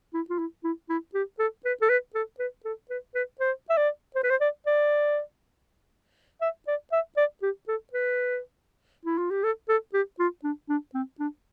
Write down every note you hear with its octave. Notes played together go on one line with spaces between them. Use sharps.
E4
F4
E4
E4
E4
G4
A4
B4
A4
B4
A4
B4
A4
B4
B4
C5
E5
D5
C5
B4
C5
D5
D5
E5
D5
E5
D5
G4
A4
B4
E4
F4
G4
A4
A4
G4
F4
D4
D4
C4
D4